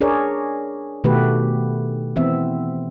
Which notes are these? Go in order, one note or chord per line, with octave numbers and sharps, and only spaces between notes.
D4 G#4 A#4 C#5 D5
B2 D#3 A3 F#4 G4 B4
E3 B3 C4 E5